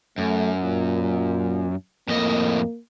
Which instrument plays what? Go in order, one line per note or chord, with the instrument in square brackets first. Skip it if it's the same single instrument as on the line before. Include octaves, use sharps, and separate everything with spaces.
[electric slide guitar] F#2 [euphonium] A3
[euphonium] A#2
[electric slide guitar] F2 A2 D#5 [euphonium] A#3